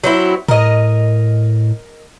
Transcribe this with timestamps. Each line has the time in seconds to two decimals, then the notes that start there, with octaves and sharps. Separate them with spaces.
0.04 F#3 C4 E4
0.48 A2 A#4 D#5